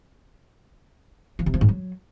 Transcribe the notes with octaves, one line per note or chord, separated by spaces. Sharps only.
F3
C3
F3
G#2
F#3